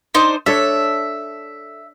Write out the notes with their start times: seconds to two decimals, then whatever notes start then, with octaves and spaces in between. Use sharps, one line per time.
0.14 D4 D#4 C5
0.46 D4 A4 C#5 E5